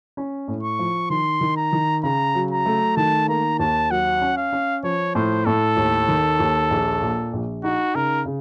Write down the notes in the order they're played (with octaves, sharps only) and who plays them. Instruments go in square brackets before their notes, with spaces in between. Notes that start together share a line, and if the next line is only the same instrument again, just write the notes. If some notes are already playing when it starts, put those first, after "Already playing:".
[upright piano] C#4
A2
[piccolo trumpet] C#6
[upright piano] F3
[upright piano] D#3 [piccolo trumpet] C6
[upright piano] D#3
[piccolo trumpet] A#5
[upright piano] D#3
[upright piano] C#3 [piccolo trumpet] A#5
[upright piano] F#3
[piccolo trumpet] A#5
[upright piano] A3
[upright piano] D#3 [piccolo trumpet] A5
[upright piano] A#3 [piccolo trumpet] A#5
[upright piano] D#2 [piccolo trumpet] A5
[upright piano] F#3 [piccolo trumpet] F#5
[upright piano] C#4
[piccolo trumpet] F5
[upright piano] C#4
[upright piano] F3 [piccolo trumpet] C#5
[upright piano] A2 [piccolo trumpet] C5
[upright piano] A2 [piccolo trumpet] A4
[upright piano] D#2
D#3
D#2
A#1
A#2
A#1
[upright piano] D#4 [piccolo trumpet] F#4
[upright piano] C#3 [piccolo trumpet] A#4
[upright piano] C#3